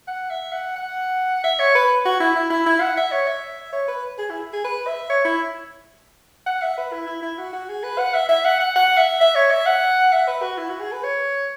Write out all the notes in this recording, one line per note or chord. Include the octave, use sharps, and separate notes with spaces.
F#5
E5
F#5
F#5
E5
C#5
B4
F#4
E4
E4
E4
E4
F#5
E5
C#5
E5
C#5
B4
G#4
E4
G#4
B4
E5
C#5
E4
F#5
E5
B4
E4
E4
E4
F#4
F#4
G#4
B4
F#5
E5
E5
F#5
F#5
F#5
E5
E5
C#5
E5
F#5
E5
B4
F#4
E4
F#4
G#4
B4
C#5